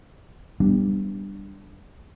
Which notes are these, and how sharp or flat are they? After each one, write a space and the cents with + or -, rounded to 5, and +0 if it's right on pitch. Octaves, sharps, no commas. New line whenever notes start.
G3 +5 B3 +0 D4 +0